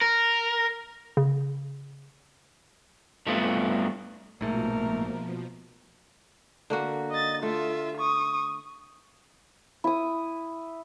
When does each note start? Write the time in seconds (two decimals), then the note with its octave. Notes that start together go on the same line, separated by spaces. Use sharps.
0.01 A#4
1.17 C#3
3.26 G2 A3 B3 C4 E4 F4
4.41 A#1 G#2 B2 F3 A3 A#3 A#4
6.70 D3 A#3 F#4
7.11 D#5 A6
7.43 A3 F4 E5
7.97 C#6 D#6
9.84 E4 D#6